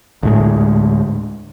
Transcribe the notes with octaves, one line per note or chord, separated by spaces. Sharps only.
D2 A2 G#3